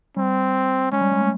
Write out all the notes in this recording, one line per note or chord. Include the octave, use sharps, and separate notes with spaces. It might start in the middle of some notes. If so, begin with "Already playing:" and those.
G3 C4
G#3 C#4
G3
G#3
A3